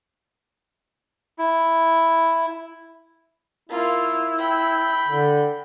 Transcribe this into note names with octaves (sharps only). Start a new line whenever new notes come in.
E4
A#3 E4 F4
G5 B5
D3